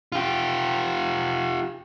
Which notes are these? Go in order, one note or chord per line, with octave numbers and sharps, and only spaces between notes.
F4 G4